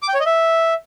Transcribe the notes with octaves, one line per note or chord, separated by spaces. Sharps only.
D6
G5
C#5
D#5
E5